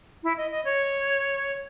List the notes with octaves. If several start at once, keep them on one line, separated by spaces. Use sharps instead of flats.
E4
D#5
D#5
C#5